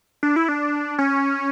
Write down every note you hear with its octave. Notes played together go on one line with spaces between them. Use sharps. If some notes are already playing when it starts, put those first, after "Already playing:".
D4
E4
D4
C#4